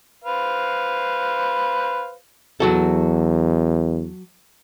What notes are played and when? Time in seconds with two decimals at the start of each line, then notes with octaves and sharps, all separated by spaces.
0.24 B4 C5 F5
2.60 E2 F#3 F#4 A4